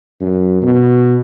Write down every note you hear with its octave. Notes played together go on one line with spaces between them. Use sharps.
F#2
B2